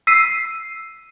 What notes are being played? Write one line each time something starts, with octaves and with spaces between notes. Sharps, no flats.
E6 B6 C7 D#7